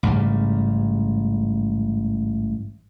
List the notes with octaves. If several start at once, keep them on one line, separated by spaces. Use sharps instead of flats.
A1 G#2 C#3 G3